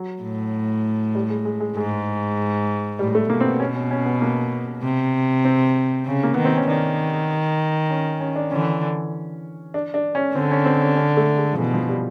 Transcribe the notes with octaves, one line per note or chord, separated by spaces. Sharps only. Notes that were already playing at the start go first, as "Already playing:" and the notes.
Already playing: F#3
A2
G3
G#3
G#3
G#3
G#2 G#3
A2 G3
A3
B2 A#3
C4
B3
C#4
C#4
C#4
B3
A#3
C3
C4
C#3
A#3
D#3 B3
C4
C#4
D#3 D4
C#4
C#4
D4
D3 E3 C#4
D4
D4
C#4
D3 C4
C#4
C4
C#4
C#4
A3
G#3
F3
B2 E3
F3
G3